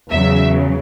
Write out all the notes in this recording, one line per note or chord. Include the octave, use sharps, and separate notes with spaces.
E2 C#3 F#3 E5